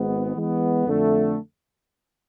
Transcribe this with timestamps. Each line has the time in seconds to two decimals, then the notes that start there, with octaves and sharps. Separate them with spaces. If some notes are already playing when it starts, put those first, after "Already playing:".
Already playing: G#1 G#2 G#3 B3
0.36 E3 G#3 B3
0.86 F2 D3 A3